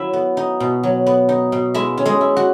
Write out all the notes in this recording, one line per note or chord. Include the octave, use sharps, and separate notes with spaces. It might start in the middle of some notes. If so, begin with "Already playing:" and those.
Already playing: F#3 E4 E5
B3
D#4
B2
F#3
B3
D#4
B2
G#3 E4 E5
C#4
G#3 G#4
E4
F#4